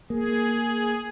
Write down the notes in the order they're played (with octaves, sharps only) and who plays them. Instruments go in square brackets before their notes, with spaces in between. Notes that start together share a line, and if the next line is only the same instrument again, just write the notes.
[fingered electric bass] A#3 [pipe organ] G#4